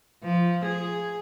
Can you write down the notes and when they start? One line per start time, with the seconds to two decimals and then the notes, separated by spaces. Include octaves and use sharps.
0.24 F3
0.65 G#4